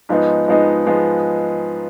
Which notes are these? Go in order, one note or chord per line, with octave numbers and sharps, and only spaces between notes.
G#2 F3 G#3 B3 D#4
G#2 F3 G#3 B3 D#4
F3 G#3 B3 D#4